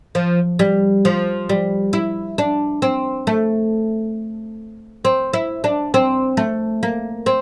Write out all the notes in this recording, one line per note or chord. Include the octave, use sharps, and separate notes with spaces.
F3
G3
F3
G3
E4
D4
C4
A3
C4
E4
D4
C4
A3
A#3
C4